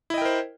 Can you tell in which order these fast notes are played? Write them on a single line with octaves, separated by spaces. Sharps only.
E4 D#5 G5 A#4 C5